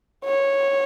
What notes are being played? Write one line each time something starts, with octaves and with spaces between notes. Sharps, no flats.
C#5